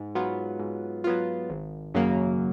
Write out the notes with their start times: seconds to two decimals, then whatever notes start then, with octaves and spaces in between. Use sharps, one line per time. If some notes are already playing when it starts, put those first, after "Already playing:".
Already playing: G#2
0.15 F#3 B3 F4
0.59 G#2
1.04 F#3 B3 F4
1.50 G#1
1.94 F#2 C#3 F#3 A#3